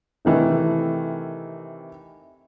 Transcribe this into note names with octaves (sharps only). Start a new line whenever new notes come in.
C3 D#3 E3 A3 A4